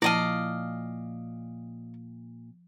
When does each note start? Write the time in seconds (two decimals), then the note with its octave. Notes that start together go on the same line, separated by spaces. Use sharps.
0.02 A#2 F3 E4 D5 D#5 F5 A5